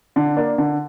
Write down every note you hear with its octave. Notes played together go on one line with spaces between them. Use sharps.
D3
A#3 D4
D3